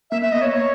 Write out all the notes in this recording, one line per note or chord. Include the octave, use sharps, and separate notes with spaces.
A#3 E5
B3 E5
A#3 D#5
B3 C#5
A#3 C#5